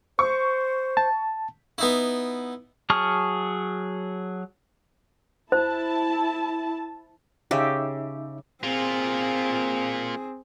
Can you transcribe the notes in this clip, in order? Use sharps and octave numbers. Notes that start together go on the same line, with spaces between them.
C5 C#6
A5
B3 D#4 E4
F#3 G#4 A5 C#6 F6
E4 C5 A5
C#3 D#4 G4 E5 E6
A#3 C4 F4 G#4